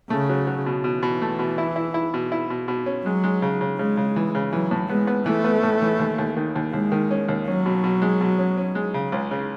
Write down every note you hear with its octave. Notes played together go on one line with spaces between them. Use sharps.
C#3 A3
F#3
F#3
B2
B2 E3
B2
A3
B2
E4
E4
E4
B2
E4
B2
B2
C#4
F#3 G#3
G#3
C#3
C#3
C#3 G#3
C#3
E3
C#3
E3 F#3
A2
G#3 B3
B3
E3 A3
B3
A2
E3
D#2
D#2
D#3
D#2
D#2 G#3
D#3
C#4
D#2
F#3 C#4
B2
B2
G#3
B2
C#4
C#4
G#3
C#3
C#2
C#3